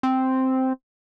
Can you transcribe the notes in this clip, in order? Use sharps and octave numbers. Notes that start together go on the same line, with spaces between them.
C4